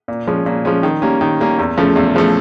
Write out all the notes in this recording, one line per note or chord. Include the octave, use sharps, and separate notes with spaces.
A#2
F3 G#3 C#4
A#2
F3 G#3 C#4
D#3
G3 A#3 C#4
D#3
G3 A#3 C#4
E2
C#3 F3 A3
E2
C#3 F3 A3